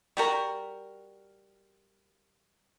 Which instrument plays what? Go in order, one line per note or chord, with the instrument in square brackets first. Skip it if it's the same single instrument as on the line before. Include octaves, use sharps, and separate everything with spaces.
[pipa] G3 F#4 A#4